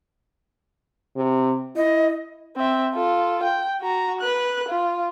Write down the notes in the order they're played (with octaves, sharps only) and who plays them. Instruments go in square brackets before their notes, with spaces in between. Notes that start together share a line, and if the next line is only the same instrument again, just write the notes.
[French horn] C3
[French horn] E4 [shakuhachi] D#5
[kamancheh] C4 E5
F4 A4
G5
F#4 A#5
B4 F#6
F4